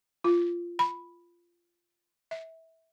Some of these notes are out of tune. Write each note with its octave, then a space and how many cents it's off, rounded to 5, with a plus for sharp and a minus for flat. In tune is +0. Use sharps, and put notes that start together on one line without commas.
F4 -10
B5 +0
E5 -20